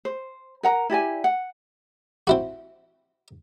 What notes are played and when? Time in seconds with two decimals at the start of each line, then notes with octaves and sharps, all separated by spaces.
0.05 C5
0.63 A#4 F#5 A#5
0.90 E4 G4 D5 G#5
1.24 F#5
2.27 C4 E4 F#4